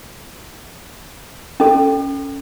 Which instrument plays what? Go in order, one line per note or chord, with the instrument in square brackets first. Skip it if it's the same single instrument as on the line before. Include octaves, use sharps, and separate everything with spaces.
[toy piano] C#4 A4